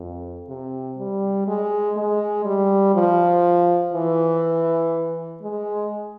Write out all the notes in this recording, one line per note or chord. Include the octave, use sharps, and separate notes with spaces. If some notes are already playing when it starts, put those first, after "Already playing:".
Already playing: F2
C3
G3
G#3
G#3
G3
F3
E3
G#3